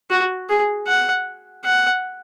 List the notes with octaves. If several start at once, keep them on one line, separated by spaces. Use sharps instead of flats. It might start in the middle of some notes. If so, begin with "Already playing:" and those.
F#4
G#4
F#5
F#5